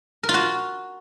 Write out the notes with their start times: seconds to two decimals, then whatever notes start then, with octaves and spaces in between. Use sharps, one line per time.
0.23 A#4
0.29 F4
0.34 F#4